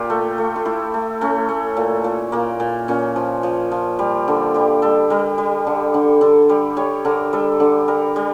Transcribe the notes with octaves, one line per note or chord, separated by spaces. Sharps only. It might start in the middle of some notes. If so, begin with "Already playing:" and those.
Already playing: A#2 F4 G4
A3
A3
F4
A3 E4
A3
A3 C#4
A3
A#2
A#2
A#2 A#3
A#2
A#2 C#4
F3
F3
F3
G3
D3
G3 G4
G3 A4
G3 A#4
G3
D3
D3
D3 A4
G3
G3 C#5
D3 A#4
G3 A4
D3
G3 A#4
G3